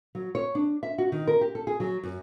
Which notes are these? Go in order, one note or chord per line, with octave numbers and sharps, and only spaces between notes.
F#3
C#5
D4
E5
F#4
D#3
A#4
G4
A4
G#4
F#3
F#2